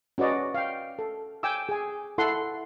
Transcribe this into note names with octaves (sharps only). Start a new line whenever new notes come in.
C#4 F#4 B4 D5 D#5
F5 G5
A4
G5 G#5 D6 E6
G#4 G#5
E4 A4 F#5 C6